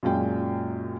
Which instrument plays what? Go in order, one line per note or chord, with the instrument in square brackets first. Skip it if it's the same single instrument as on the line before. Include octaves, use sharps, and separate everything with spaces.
[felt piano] F#2 A#2 G#3 C#4 G5